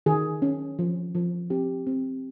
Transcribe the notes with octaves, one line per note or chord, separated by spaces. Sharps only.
D#3 G#4
C#4
F3
F3
C4 G4
C4